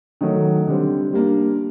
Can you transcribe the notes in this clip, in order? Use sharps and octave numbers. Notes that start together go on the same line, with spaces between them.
D#3 F#3 A3
D3 G3 C4
G3 A#3 D4